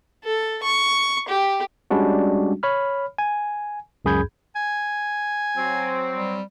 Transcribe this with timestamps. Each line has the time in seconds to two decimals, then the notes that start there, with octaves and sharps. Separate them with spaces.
0.24 A4
0.63 C#6
1.29 G4
1.91 G3 G#3 C#4 D4 F#4
2.63 C#5 B5 F6
3.18 G#5
4.05 C#2 F#2 G#4 B5 G6 G#6
4.56 G#5
5.57 F#3 C4
6.13 G3